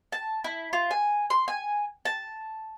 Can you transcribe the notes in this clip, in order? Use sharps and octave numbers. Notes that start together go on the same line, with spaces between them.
A5
E4
F4
G#5
C6
G#5
A5